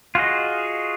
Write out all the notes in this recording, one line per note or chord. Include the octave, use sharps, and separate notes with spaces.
F4 F#4 G#4 D#5